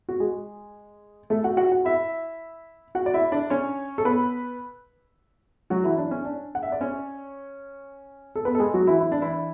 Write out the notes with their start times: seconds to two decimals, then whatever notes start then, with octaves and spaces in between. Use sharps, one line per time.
0.09 F#4
0.20 G#3 G#4
1.30 A3 A4
1.44 F#4 F#5
1.57 F#4 F#5
1.72 F#4 F#5
1.85 E4 E5
2.95 F#4 F#5
3.06 D5
3.14 E4 E5
3.32 D4 D5
3.50 C#4 C#5
3.98 A4
4.05 B3 B4
5.70 F#3 F#4
5.84 E3 E4
5.98 D4
6.11 C#4
6.25 D4
6.55 F#5
6.63 E5
6.72 D5
6.81 C#4 C#5
8.36 A4
8.45 B3 B4
8.55 A4
8.59 G#3 G#4
8.74 F#3 F#4
8.87 E3 E4
9.01 E4
9.12 D4
9.22 E3 E4